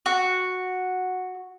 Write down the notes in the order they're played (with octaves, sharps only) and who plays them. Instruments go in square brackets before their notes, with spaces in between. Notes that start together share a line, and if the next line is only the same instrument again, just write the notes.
[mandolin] F#4